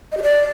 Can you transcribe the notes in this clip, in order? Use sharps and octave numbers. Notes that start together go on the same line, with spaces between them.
D#5
G4
D5